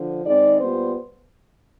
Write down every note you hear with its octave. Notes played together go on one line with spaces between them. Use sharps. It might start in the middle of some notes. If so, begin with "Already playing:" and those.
Already playing: D3 F3
D#3 G#3 C4 D#4 D5
A#2 G3 B3 C5